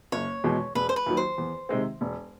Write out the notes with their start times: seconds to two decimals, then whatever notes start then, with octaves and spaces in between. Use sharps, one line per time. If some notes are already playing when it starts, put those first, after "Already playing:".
0.12 F#1 C#5
0.44 E2 B2 G#3
0.75 E1 B4
0.89 C5
0.96 B4
1.06 D#2 D#3 F#3
1.17 C5
1.38 E2
1.69 C3 D#3 G#3 C4
2.01 E1